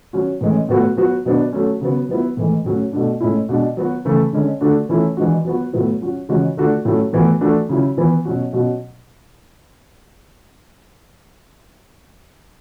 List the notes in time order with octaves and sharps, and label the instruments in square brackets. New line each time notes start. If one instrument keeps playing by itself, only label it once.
[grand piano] F#3 C#4 F#4
A2 E3 G#3 C#4
A2 F#3 B3 F#4
F#3 B3 F#4
B2 F#3 B3 D4
F#3 A3 C#4
C#3 F#3 B3
F#3 B3 E4
A2 E3 G#3
A2 F#3 C#4
B2 A3 D4
A2 G#3 C#4 E4
B2 G#3 D4
F#3 B3 F#4
C#3 E3 A3
D3 G#3 C#4
D3 A3 D4 F#4
E3 A3 C#4 E4
E3 G#3 D4 F#4
F#3 B3 F#4
A2 F#3 B3 E4
F#3 C#4 F#4
C#3 E3 G#3 C#4 F#4
D3 A3 D4 F#4
A2 F#3 A3 C#4 E4
A2 E3 B3 F#4
E3 A3 D4 F#4
C#3 F#3 C#4 E4
E3 B3 E4
B2 F#3 C#4 F#4
B2 F#3 C#4 F#4